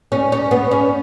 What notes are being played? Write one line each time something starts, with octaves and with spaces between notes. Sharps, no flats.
C#4
C#4
B3
C#4